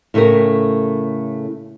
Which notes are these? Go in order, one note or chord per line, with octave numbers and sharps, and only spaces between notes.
A2 C#3 A3 G4 A#4